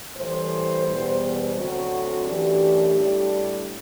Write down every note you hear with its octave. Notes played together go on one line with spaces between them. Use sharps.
A2 E3 G3 C5
E2 B2 G3 B3
D2 D3 F#3 C4 F#4
F#2 E3 A3 D4 G4
A2 G3 D4